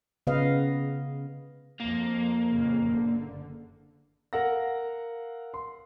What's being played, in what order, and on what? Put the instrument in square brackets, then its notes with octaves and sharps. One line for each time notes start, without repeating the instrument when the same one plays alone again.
[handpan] C#3 B3 B4 D#5 F5
[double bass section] F2 F3 [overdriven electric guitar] A#3
[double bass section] F2 A#2 C#3
F#1 D3
[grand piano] A#4 F5 F#5 E6 A#6
C6